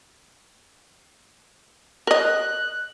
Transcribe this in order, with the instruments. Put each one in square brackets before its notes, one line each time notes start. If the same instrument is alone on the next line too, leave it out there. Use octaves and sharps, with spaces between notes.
[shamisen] A#4 D#5 [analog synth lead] F#6